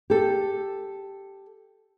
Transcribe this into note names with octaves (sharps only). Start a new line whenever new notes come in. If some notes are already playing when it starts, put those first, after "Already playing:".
G4 A4